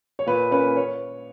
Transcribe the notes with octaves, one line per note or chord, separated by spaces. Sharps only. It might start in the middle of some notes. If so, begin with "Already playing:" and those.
C#5
A#2 B4
A#3 C#4 B4
C#5